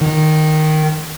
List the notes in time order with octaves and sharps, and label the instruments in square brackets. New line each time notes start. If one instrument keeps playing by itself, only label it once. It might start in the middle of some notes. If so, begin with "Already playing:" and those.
[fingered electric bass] D#3